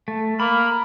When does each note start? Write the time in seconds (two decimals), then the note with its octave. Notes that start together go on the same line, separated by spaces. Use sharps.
0.08 A3
0.40 A#3 B5